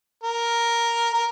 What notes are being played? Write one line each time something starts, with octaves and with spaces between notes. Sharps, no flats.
A#4
A#4